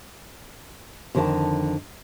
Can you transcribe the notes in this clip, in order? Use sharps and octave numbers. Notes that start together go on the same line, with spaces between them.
F2 D3 D#3 A#4 A5